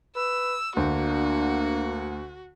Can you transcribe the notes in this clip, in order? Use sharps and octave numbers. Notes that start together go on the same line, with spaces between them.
B4 E6
D2 A#3 D4 F#4